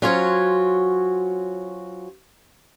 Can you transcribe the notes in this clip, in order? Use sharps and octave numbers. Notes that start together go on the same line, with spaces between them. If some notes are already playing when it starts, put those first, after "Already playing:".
F#3 C#4 F4 F#4 C5 C#5